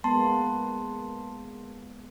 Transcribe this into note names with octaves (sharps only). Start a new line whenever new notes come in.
G#3 A#3 B3 A5 C6